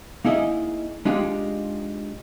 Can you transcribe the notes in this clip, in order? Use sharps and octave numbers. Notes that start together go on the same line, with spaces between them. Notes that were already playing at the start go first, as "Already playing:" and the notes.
A#3 D#4 E4 G#4 D#5
G#3 D4 D#4 F4 G4 G#4